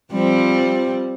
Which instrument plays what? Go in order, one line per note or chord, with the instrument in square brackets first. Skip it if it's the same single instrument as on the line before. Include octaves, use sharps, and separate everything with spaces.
[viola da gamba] F3 G3 C4